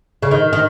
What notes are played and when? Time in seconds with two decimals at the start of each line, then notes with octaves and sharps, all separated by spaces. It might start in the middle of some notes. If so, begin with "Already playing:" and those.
0.22 C#3
0.31 D#3
0.53 D#3